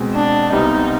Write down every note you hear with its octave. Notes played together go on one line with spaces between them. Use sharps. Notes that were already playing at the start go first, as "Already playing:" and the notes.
Already playing: B2 G#3 C4
D4
C2 C3 G3 B3 D#4